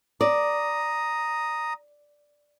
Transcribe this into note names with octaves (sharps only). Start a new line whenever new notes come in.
D5 A#5 D#6